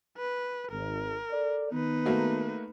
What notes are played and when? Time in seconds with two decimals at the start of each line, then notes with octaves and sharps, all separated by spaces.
0.18 B4
0.71 G#1 A#4
1.32 A4 D5
1.72 D#3 B3 D#4 B4
2.05 A3 A#3 F#4